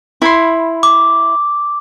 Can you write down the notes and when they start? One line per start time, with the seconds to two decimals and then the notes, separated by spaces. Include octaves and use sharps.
0.22 E4 B5 C6
0.83 D6